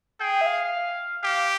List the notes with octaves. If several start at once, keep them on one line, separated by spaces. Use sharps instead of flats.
G#4 G5
E5
F5
G4 F5